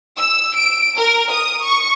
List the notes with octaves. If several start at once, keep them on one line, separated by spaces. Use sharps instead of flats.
E6
D7
A#4
D#6
C#6